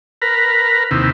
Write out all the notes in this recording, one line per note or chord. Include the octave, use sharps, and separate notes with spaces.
A#4 B4
D#2 C3 E4